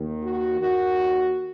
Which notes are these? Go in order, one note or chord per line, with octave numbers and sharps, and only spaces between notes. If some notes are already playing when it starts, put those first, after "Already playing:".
Already playing: D#2 D#3
F#4
D#2 D#3 F#4